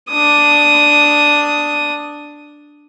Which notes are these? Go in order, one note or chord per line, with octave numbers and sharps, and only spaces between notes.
D4 D#6